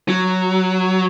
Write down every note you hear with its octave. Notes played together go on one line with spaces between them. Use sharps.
F#3